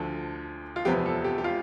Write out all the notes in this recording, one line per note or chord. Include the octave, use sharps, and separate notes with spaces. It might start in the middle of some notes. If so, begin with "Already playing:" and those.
Already playing: D2 D3 F3 A4
F4
E2 C3 F3 B3 G4
A4
G4
G4
F4